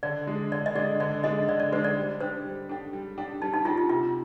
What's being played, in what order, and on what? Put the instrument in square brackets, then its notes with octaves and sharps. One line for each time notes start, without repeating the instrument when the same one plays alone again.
[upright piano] D3 [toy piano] D5
[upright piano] G#3 D4
[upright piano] D3 [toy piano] D5
[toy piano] D#5
[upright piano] G#3 D4 [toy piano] D5
[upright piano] D3 [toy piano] D5
[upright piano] G#3 D4 [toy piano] D#5
[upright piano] D3 [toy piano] D5
[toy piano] D5
[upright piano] G#3 D4 [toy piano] C5
[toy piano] D5
[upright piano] G3
[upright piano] D4 G4 [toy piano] C5
[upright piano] G3
D4 G4
G3
D4 G4
[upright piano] G3 [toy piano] D#4
[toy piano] D#4
[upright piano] D4 G4 [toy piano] F4
[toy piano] F4
[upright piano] C3 [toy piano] F4